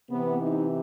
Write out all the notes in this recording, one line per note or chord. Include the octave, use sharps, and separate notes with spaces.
C3 E3 B3
D#4